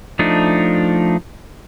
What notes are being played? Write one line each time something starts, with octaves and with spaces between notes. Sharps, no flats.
F3 A3 D4 D#4